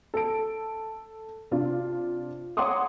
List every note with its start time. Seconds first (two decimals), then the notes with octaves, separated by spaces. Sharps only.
0.14 A4 D7
1.51 C3 D4 F4
2.57 C#5 F#5 A#5 C6 D6 D#6